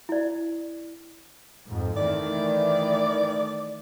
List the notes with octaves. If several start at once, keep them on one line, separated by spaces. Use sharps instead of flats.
E4 D5
F2 G#2
D#3 E3 A3 D5